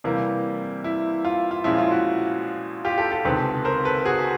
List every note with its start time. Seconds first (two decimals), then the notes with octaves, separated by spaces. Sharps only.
0.04 C3 E3 G3 A#3
0.84 E4
1.25 F4
1.51 F4
1.64 A#2 F3 G#3 C#4 E4
1.78 F4
1.91 E4 F#4
2.85 F4 G4
2.98 G4 A4
3.12 G4 A4
3.25 C#2 C3 D#3 G#3 C4 A4 B4
3.65 A#4 C5
3.85 A4 B4
4.05 F#4 G#4